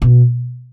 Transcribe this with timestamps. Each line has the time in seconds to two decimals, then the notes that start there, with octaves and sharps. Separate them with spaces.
0.02 B2